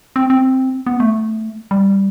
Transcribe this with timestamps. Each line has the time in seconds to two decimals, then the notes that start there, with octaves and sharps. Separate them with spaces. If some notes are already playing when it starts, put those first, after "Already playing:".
0.16 C4
0.30 C4
0.87 B3
1.00 A3
1.71 G3